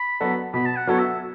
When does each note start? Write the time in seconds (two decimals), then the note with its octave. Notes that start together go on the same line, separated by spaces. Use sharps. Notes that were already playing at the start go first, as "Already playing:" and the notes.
Already playing: B5
0.20 F#3 B3 F#4 A4
0.54 B2 B5
0.66 A5
0.76 F#5
0.87 F#3 B3 F#4 A4 C#5
0.99 E5